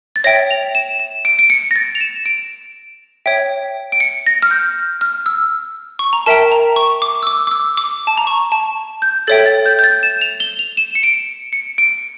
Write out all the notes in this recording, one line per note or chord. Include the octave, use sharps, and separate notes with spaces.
A6
C#5 E5 G5 A#6
F7
E7
E7
D7
D7
C#7
A#6
A6
F7
E7
D7
C#5 E5 G5
D7
C#7
A#6
F6
G6
F6
E6
C#6
A#5
A#4 E5 G5 A5
A#5
C#6
D6
E6
D6
D6
E6
D6
A5
A#5
C#6
A5
G6
A4 C#5 E5 G5 A6
A6
G6
G6
A6
E7
F7
G7
F7
E7
C#7
D7
C#7
D7